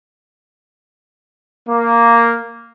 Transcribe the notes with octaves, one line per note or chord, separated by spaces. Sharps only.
A#3